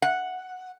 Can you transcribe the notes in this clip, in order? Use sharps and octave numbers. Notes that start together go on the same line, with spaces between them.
F#5